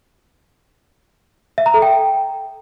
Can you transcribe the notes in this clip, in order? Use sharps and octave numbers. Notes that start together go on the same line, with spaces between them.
E5
A#5
A4
G5